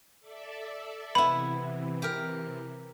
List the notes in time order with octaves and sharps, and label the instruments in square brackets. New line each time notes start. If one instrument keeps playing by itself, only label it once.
[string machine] A4 D5 E5
[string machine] C3 E3 [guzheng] B3 E4 [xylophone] B5
[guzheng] G4 A#4